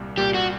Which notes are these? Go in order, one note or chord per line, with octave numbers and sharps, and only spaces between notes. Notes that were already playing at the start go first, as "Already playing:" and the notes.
Already playing: C2 A#2 G3
C2 A#2 G3 G4
F#4